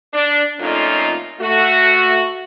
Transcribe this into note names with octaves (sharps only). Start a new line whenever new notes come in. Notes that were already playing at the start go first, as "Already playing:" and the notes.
D4
F2 A#2 A3 C#4 D#4 F4
A3 F#4